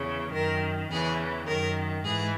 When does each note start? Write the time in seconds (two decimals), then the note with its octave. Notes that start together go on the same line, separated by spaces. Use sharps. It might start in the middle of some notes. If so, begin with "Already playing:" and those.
Already playing: E2 C#3 E3
0.32 F#2 D#3 A#4
0.90 E2 C#3 E3 G#4
1.47 F#2 D#3 A#4
2.04 G#2 E3 G#4